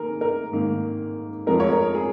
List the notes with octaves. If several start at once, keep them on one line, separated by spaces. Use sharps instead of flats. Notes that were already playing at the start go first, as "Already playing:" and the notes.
Already playing: D#3 A#3 G#4 A#4
A#4
G#2 D#3 A#3
F2 F3 G#3 A#4
C#5
A#4
G#4